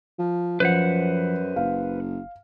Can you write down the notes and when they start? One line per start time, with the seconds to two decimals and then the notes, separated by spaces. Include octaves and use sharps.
0.19 F3
0.60 F#2 F3 B4 C5 F#5
1.56 F#1 F5